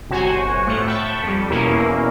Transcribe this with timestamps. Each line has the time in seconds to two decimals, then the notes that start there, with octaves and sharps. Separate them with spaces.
0.09 G1 C3 F#4 C5 C#5 G#5
0.67 A2 A3 F4 F#5 C#7
0.87 G5 A5 B5 C#6
1.23 F2 G3
1.50 E2 B2 A#3 C#4 E4